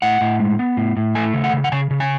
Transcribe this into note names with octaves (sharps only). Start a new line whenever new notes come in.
A2 F#5
A2
G#3
B3
A2
A2
A3 G#5
C#3
F#5
C#3
F#5
C#3 G#5
C#3
G#5